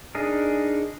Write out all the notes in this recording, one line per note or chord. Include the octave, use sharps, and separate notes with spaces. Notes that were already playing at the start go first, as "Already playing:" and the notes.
D4 D#4 G#4 A#4